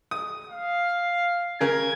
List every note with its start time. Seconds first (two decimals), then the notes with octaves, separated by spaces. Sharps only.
0.11 D#6
0.49 F5
1.61 C#3 A#4 G#6